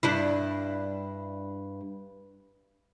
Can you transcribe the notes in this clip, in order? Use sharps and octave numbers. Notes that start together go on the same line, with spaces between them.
G2 D4 E4